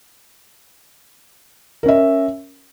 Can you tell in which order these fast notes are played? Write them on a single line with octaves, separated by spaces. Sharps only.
A#4 C#4 E5